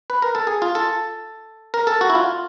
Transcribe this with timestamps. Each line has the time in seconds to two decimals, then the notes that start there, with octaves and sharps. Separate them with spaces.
0.10 B4
0.22 A#4
0.35 A4
0.47 G#4
0.62 F4
0.75 A4
1.74 A#4
1.87 A4
2.01 F#4
2.10 E4
2.15 F4